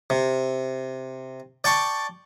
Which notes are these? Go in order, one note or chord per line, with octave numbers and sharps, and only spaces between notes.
C3
D5 G5 A5 C#6